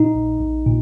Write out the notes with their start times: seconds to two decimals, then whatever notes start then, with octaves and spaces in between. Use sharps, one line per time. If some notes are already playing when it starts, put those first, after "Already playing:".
Already playing: A#2 D#4
0.15 A#1
0.40 A#1
0.66 A#2